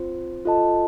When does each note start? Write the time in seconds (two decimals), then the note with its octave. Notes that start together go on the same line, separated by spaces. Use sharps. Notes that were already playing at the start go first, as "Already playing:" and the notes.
Already playing: C4 F4 C5
0.45 F4 A4 D#5 A5